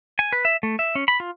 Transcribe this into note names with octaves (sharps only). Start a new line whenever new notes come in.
G#5
B4
E5
A3
E5
C#4
B5
F4